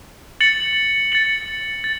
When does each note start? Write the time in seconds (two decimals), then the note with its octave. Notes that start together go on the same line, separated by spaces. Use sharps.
0.40 A6 C#7 F#7
1.12 A6 C#7 F#7
1.84 A6